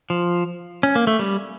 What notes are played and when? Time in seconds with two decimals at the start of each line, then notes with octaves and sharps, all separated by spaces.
0.10 F3
0.83 C#4
0.95 A#3
1.07 A3
1.19 G3